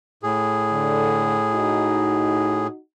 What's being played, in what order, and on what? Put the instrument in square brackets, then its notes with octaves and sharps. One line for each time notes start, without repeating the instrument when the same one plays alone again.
[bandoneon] A2 G#4
[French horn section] D3
D#4 F#4